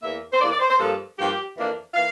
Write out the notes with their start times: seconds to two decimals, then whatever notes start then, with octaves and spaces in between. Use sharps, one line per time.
0.02 E2 E3 A#3 E5
0.33 C5
0.40 E2 E3 A#3 D5
0.51 D5
0.59 C5
0.70 C5
0.79 G2 F3 A#3 A4
1.17 G2 F3 A#3 G4
1.56 F2 E3 A#3 D4
1.94 E3 A#3 F5